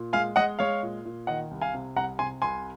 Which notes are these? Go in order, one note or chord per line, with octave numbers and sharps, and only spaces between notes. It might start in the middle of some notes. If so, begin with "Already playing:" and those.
Already playing: A#2
G#3 F5 G#5
G#3 D#5 F#5
G#3 C#5 F5
A#2
A#2
D#3 D#5 F#5
C2
F5 G#5
C3
C2 F#5 A#5
C3 G#5 C6
C2 G#5 C6